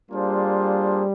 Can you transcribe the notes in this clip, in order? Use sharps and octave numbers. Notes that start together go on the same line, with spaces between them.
G3 A#3 D4 F4 G#4 C5